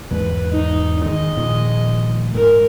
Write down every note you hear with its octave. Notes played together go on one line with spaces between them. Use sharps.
E2 G#2 G#3 B4
D#4
D#3 G#3 D#5
A#2 D#3 F3
G#2 A#4